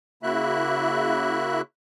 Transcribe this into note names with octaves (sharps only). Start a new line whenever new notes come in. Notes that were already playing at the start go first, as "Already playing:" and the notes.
C#3 A#3 E4 F#4 E5 F#6